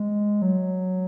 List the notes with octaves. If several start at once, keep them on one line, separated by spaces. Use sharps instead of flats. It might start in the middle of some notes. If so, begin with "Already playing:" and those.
Already playing: G#3
F#3